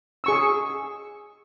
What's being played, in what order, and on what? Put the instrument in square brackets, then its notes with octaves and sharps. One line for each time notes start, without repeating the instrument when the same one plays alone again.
[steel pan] G#4 C#6 E6